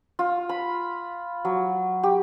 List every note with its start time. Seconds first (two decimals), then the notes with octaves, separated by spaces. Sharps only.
0.19 F4
0.49 B5
1.45 F#3
2.03 G4